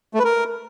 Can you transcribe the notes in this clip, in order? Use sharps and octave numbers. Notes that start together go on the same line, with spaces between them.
A3
B4
A#4